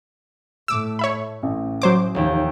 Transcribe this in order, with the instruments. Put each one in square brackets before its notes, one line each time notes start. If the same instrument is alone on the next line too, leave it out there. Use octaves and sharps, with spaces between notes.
[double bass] A2 A3 [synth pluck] D6 E6
[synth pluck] C#5 E5 B5
[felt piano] A1 [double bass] A2
[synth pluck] F#3 C5 D6
[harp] F1 D#2 G5